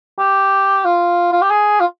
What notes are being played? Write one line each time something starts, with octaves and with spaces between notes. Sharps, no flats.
G4
F4
F4
G4
G#4
F4